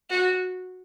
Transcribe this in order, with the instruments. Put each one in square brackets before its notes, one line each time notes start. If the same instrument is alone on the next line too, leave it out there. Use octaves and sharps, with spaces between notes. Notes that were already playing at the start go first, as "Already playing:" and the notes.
[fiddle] F#4